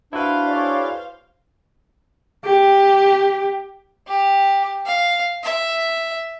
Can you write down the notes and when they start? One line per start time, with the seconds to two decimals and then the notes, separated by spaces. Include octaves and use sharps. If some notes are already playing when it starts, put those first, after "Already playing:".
0.13 D4 E4 F#4 B4 C5 F5
0.48 G#4 C#5 D5
2.45 G4
4.07 G4
4.86 F5
5.43 E5